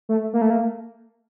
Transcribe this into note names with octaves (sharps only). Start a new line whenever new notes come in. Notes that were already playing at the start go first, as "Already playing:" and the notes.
A3
A#3
A3
A#3